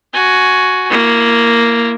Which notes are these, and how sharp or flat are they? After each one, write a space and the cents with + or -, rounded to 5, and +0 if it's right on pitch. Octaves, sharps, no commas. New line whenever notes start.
F#4 +0 G#5 +15
A#3 +0 E4 +30